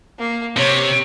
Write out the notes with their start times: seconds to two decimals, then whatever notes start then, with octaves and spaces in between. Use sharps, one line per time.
0.19 A#3
0.57 C3 C#5